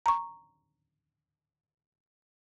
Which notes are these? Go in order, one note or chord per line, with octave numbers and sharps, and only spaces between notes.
A#5 C#6